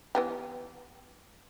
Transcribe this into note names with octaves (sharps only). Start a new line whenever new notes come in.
E3 B3 G4